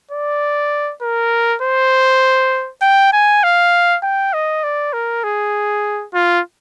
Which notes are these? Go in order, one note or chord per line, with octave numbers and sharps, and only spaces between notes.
D5
A#4
C5
G5
G#5
F5
G5
D#5
D5
A#4
G#4
F4